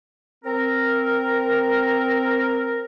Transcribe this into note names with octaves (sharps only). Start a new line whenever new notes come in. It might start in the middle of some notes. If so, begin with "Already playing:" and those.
C4 A#4